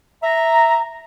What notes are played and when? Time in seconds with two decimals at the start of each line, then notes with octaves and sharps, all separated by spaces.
0.23 E5 A#5